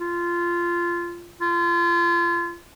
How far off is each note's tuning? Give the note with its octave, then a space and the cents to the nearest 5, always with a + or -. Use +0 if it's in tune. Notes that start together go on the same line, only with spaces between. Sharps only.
F4 -15
F4 -30